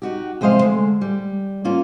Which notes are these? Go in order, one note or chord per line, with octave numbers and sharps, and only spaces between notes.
D#4 F#4 G4
F2 C3 G#3 C5 D#5 F5
D3 G#3 A3
G3
A#3 C#4 F4